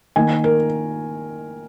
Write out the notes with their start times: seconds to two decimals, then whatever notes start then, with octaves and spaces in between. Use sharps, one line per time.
0.16 D#3 A#3 G#5
0.44 A#4